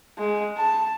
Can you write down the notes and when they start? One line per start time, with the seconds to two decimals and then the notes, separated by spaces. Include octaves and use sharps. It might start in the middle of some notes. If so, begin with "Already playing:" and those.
0.18 G#3
0.57 A5